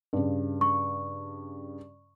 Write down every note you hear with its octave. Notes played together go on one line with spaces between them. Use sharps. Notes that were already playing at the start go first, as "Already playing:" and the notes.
G2 C#3
C#6